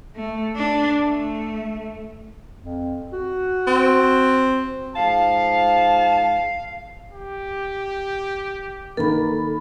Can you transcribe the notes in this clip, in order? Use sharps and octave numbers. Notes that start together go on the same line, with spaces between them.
A3
D4
A3
F2
F#4
C4
G#2 F3 F5 A5
G4
D#3 A#3 A4 B5